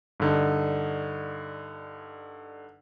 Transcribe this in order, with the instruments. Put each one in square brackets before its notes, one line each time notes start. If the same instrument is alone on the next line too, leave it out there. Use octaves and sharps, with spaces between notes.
[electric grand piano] G2 D3 D#4